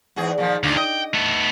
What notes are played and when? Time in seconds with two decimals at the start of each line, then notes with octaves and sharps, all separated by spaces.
0.16 E2 G#2 G#4
0.38 A#2 D#3 F3
0.63 D2 A#2 D#3 D4
0.77 D#5 G5
1.14 A3 B3